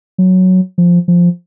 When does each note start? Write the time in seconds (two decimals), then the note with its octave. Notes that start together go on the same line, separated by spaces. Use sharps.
0.18 F#3
0.78 F3
1.08 F3